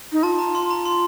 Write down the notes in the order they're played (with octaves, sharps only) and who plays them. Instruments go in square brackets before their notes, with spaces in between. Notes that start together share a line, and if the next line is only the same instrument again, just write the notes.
[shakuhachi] D#4
[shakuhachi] F4 [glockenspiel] A5
[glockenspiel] A#5
C6
A#5
C6